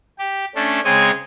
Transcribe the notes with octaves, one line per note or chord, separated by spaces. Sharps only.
G4
A3 C#4 D4
C#3 G#3 C4 C#5 D#5 G#5